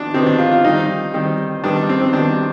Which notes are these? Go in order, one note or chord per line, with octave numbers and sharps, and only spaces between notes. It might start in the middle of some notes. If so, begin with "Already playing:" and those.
Already playing: D#3 D4
C3 D#3 B3 C4
D4
F4
F4
D#3 G3 C4 D#4
D#3 G3 C4
D#3 G3 B3 D4
C4
C4
D#3 G3 B3 D4